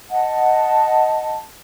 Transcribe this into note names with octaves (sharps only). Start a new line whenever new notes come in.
D#5 F#5 A5